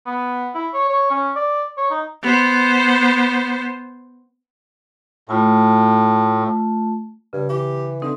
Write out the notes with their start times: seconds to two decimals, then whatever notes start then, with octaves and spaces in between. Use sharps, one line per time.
0.06 B3
0.55 E4
0.74 C#5
0.90 C#5
1.10 C#4
1.36 D5
1.78 C#5
1.90 D#4
2.23 B3 C5
5.29 A2 A3 F4 A5
7.33 G2 C#3
7.50 E3 G4
8.02 D3 C4 D#4